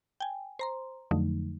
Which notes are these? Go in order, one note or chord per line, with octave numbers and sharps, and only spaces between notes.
G5 G#5
C5 A#5 C6
F2 D3 F3 F#3 A3 D#4